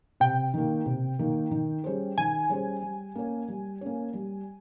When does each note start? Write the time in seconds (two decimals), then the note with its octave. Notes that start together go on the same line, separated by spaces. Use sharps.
0.20 C3 G5
0.54 D#3 A#3
0.86 C3
1.19 D#3 A#3
1.51 D#3
1.84 G3 C#4 G#4 C5
2.18 D#3 G#5
2.49 G3 C#4 G#4 C5
2.82 G3
3.15 A#3 C#4
3.48 G3
3.81 A#3 C#4
4.14 G3